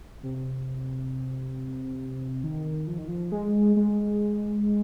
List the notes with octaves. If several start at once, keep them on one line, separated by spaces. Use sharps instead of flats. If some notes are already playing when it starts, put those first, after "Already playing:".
C3
D#3
F3
D#3
F3
G#3
G#3